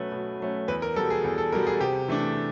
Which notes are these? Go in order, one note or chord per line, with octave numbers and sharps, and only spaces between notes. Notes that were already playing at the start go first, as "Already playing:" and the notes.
Already playing: B2 F#3 A3 C#4 B4
B2
F#3 A3 C#4
E2 B4
A#4
B2 G3 A4
G#4
E2
A4
B2 G3 A#4
G#4
C3 G4
E3 A3 D4